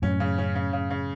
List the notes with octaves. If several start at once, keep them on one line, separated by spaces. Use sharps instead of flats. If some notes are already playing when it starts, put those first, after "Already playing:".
F#2 A2 C#4
C#3
C#4
C#3
C#3
C#3